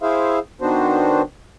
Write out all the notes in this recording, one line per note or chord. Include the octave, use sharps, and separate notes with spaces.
E4 G#4 C5 E5 F5
D#3 B3 D4 F#4 C5